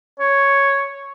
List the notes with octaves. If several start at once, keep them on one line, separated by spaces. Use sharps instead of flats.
C#5